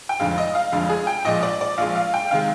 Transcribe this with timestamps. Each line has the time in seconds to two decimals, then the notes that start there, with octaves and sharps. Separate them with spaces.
0.09 G5
0.20 F1 F2 D3 F3 G#3 F5
0.38 D#5
0.55 F5
0.72 F1 F2 D3 F3 G#3 F5
0.89 G#4
1.07 G5
1.25 A#1 A#2 F3 G#3 D#5
1.43 D5
1.61 D5
1.78 A#1 A#2 F3 G#3 F5
1.96 F5
2.14 G5
2.31 C3 D#3 G#3 F5